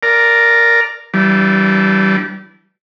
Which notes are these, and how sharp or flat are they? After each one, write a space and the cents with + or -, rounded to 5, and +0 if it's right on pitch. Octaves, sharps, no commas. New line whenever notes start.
A#4 +0 D5 +0
E3 +0 G3 -30 D4 +0